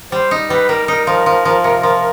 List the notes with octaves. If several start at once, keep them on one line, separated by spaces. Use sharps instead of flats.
G3 C5
D#4
G3 B4
G3 A#4
D#4 A#4
F3 A#4
F3
F3
C3
F3